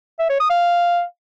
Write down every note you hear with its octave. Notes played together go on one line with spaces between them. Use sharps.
E5
C#5
D#6
F5